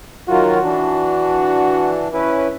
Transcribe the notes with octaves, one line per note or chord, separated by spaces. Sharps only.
D#3 F#3 F4 F#4
E3 D4
C#4 E4 B4